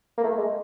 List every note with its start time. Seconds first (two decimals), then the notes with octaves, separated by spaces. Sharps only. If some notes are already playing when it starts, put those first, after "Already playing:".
0.18 A#3
0.24 A3
0.37 G#3